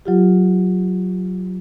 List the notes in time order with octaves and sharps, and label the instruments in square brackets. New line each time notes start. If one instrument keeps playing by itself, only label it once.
[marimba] F#3 F4 G4